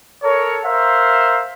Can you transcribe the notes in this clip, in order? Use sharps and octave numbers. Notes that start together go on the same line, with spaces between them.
A4 A#4 C#5
A#4 C5 E5 F5